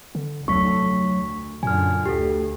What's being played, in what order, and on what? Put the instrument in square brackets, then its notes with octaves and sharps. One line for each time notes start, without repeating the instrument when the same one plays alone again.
[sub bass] D3
[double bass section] F1 D2 A3 [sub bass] F#3 [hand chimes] C#6 B6
[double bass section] D2
[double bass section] F#2 D3 [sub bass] A#2 [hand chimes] G#5 F6
[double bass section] D2 [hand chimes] G4 A4